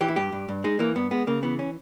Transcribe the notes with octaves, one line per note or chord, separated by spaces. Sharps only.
E3 G4
E4
G2 G4
G2
G2
G#3 D#4
E3 A#3
G2 B3
G#3 B3
C#3 A#3
E3 B3
C#4